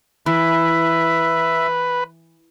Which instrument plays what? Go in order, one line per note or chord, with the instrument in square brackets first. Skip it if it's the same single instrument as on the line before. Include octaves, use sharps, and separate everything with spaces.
[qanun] E3 [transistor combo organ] B4 [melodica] E5